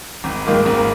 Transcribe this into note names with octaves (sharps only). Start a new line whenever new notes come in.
G#1
G#2 D#3 A#3 F4
G#1